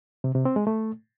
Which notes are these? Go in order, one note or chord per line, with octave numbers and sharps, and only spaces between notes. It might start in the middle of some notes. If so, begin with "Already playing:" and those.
C3
C3
C4
G#3
A3